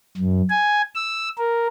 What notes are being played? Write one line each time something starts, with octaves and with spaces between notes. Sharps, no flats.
F#2
G#5
E6
A#4